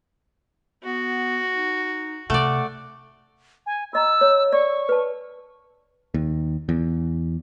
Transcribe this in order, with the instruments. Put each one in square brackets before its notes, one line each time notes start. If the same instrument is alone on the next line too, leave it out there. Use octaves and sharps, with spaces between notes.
[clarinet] B3 [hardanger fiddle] F#4
[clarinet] D#4
[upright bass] C3 [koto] A3 D5 [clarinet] F#5
[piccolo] G#5
[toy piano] F4 D#5 A#5 [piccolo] E6
[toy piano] C#5
[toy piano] D5 [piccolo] C#6
[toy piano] B4 A5
[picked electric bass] D#2
E2